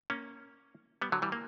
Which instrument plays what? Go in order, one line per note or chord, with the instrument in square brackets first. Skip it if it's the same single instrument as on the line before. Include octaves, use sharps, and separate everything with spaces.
[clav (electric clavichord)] A#3 C#4
G3 B3
D3 F#3
E3 G3
A#3